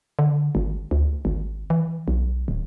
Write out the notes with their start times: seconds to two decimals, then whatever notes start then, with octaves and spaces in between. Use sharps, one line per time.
0.19 D3
0.55 G#1
0.91 D2
1.25 G#1
1.70 E3
2.08 B1
2.48 D1